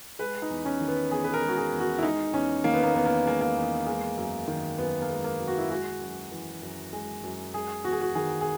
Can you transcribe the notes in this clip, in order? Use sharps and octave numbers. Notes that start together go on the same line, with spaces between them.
G#3 B4
D#4
E2
C#4
D#3
B3
E2 G#4
B4
A#4
G#3
F#4
G#4
E2
F#4
E4
G#3 D#4
E2 C#4
D#3 A#3
B3
A#3
E2 B3
A#3
G#3 A#3
A#3
E2
G#3
F#2
D#3
F#2 B3
A#3
G#3
A#3
F#2
F#4
E4
G#3 F#4
F#2
E3
F#2
G#3
F#2
G#3 G#4
E2 F#4
G#4
F#4
D#3 G#4
G#4